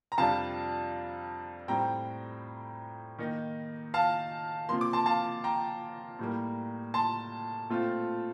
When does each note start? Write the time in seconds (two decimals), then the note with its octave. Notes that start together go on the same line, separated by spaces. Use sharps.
0.12 A#5
0.18 F2 C3 G3 D4 F5 A5
1.68 A2 G3 C4 G5 A#5
3.19 D#3 A#3 D#4
3.94 F5 A5
4.69 C3 F3 A#3 C6
4.81 D6
4.93 A5 C6
5.06 F5 A5
5.44 G5 A#5
6.19 A2 G3 A#3
6.94 A5 C6
7.69 A#2 A3 C4 F4